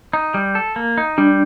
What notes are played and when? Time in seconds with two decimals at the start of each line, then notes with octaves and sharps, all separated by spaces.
0.13 D#4
0.34 G3
0.55 A4
0.76 A#3
0.98 D#4
1.18 G3 D4